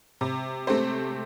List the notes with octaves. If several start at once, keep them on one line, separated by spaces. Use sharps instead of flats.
C3
A3 C4 G4 C5